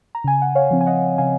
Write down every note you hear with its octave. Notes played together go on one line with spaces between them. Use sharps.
A#5
C#3 G#5
F#5
C#5 F5
F3 C4
G#5
D#5 F#5
C#3 F5 G#5